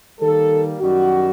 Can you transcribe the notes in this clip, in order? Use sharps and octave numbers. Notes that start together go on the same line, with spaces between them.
D#3 G3 A#3 A4
F#2 D#3 G3 F#4